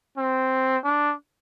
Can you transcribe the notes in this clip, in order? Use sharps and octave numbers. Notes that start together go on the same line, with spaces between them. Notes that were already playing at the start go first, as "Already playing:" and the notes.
C4
D4